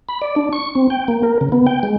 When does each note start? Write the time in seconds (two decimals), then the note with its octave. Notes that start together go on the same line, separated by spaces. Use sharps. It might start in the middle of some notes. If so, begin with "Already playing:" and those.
0.09 B5
0.22 D5
0.36 D4
0.53 C#6
0.75 C4
0.90 G5
1.08 A#3
1.23 A#4
1.41 C#3
1.52 B3
1.67 G5
1.83 G#3